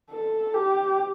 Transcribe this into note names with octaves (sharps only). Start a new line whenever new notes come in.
A4
G4